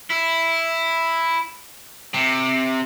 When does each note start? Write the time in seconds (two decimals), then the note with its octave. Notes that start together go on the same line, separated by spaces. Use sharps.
0.10 E4
2.14 C3